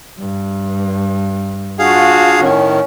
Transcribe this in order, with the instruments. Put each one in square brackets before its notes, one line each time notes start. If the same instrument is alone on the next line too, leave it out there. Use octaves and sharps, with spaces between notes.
[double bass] G2
[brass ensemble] D4 F4 F#4 [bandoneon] G#4 F5
[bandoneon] A2 D#3 [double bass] C#4